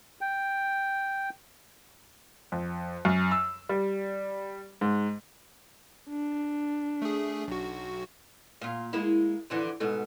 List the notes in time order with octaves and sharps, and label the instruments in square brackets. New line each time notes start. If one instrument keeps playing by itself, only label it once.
[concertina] G5
[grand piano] F2
F#2
E6
G3
G#2
[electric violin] D4
[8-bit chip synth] A3 G#4
B1 F#4
[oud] A#2 F4
G#3 A#3 E4
D3 E3 F3
G#2 B2 A3